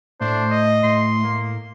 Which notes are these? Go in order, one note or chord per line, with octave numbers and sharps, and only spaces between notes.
A2 A3 D4 C5
D#5
A2 C6
A#3